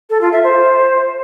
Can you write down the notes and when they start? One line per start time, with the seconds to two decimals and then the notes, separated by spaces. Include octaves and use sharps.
0.10 A4
0.21 F4
0.32 E5
0.44 C5